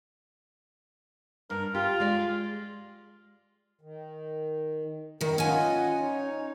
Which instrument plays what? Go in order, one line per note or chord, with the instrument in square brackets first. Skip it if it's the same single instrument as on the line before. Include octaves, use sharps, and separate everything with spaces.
[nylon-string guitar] G2 [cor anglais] A#4
[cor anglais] F4 [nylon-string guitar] G4
[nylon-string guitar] G#3 D5
[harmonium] D#3
[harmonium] F#2 A#4 [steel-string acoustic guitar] A2 D#3
[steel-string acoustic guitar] C#4 G#5 [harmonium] F4 D#5 F#5
[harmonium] D#4 C#5